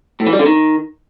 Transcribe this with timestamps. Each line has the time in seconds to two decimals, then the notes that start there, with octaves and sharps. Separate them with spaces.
0.20 A2
0.26 E3
0.33 G3
0.39 D3
0.46 D#3